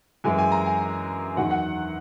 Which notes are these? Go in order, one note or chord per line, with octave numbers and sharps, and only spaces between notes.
F#2 E3 G#3 G#5
G#5
A#5
G#5
E2 D#3 F#3 F#5
F#5